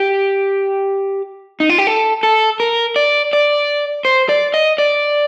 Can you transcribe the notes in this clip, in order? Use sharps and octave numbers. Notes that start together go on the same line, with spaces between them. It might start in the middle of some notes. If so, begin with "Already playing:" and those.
Already playing: G4
D#4
F4
G4
A4
A4
A#4
D5
D5
C5
D5
D#5
D5